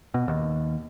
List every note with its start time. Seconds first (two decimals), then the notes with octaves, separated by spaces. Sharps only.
0.14 B2
0.28 D#2